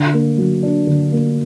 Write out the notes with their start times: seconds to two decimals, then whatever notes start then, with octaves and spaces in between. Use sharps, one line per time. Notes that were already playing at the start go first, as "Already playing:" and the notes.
Already playing: D3
0.13 A#3
0.38 F#3
0.63 D4
0.87 D3
1.12 A#3